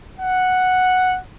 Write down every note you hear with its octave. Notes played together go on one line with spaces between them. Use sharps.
F#5